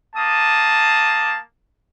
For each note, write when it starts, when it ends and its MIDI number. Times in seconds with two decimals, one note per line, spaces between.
0.16 1.37 58
0.16 1.37 81
0.16 1.37 87